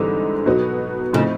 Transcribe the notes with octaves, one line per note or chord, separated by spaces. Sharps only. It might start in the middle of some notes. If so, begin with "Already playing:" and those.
Already playing: G#2 D3 E3 G3 C4 D#4
B2 F#3 B3 D#4 F#4
A2 C#3 F3 A3 C4 D#4